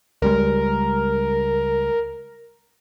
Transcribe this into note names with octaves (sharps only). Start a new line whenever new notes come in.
C#2 G3 G#3 A#4